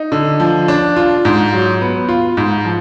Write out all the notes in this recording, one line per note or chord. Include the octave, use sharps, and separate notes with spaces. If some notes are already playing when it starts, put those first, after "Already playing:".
Already playing: D#4
D3
F3
D4
F4
G#2
F#3
B3
F4
G#2
F3